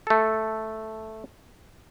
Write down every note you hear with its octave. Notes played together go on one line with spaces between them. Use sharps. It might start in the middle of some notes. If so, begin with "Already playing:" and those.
A3 A4